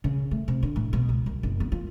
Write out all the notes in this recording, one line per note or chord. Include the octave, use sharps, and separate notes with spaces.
C#3
A3
C3
D3
A2
B2
C#2
F#2
F#1
B3
F4